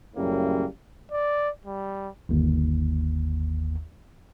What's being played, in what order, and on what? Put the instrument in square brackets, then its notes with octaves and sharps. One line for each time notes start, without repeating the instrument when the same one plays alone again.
[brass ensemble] F#2 A2 C#3 G3 A#3
[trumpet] D5
G3
[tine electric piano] G1 D#2